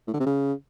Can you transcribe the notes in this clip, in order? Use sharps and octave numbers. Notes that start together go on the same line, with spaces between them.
A2
D3
C3
C#3